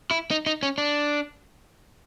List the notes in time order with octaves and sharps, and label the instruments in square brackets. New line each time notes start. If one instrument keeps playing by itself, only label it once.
[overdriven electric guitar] E4
D#4
D#4
C#4
D4